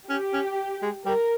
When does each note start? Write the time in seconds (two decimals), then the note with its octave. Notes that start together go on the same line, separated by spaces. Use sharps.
0.09 C#4 G4
0.33 C#4
0.82 G#3
1.06 G3 A#4